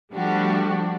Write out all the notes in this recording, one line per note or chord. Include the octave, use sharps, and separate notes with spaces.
F3 G3 A3 D4 F#4 G4